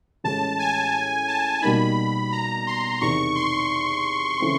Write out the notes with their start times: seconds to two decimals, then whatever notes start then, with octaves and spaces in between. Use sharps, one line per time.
0.24 A1 A2 E3 G#3 C#4 A5
0.59 G#5
1.28 A5
1.62 B2 G3 A#3 D#4 B5
2.32 A#5
2.67 C6
3.01 E2 C3 D#3 C#6
3.35 C6
4.40 C#3 E3 A3 C4